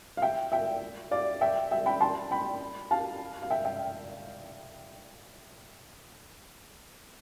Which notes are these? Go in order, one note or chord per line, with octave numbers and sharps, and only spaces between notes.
F5
E5 G5
E5 G5
D5 F5
E5 G5
E5 G5
G5 B5
A5 C6
G5 B5
F5 A5
F5
E5 G5
E5 G5